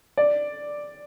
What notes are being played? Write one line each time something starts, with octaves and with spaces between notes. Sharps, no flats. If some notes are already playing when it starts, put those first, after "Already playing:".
D5